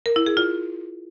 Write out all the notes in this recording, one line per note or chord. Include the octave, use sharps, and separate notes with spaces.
A#4
E4
G#4
F4